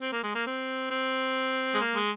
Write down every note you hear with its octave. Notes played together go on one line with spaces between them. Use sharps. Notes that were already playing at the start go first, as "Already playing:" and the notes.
C4
A#3
G#3
A#3
C4
C4
G#3
A#3
G#3